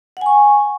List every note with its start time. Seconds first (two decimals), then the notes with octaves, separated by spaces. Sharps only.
0.17 F#5
0.21 G#5
0.26 C#6